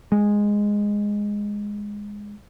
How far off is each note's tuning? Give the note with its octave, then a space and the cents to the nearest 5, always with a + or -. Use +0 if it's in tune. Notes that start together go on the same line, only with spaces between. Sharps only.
G#3 -10